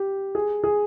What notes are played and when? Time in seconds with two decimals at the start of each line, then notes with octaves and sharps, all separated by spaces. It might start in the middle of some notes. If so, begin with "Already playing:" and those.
Already playing: G4
0.35 G#4
0.64 G#4